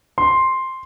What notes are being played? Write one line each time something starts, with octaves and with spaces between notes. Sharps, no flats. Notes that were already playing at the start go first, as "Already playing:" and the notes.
C6